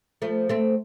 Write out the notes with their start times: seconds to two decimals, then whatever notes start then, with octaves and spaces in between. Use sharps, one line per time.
0.22 F3 A3
0.49 A3 C4